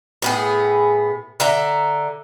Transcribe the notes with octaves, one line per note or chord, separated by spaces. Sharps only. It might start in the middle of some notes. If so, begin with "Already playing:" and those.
A2 B3 G#4
D3 E5 A#5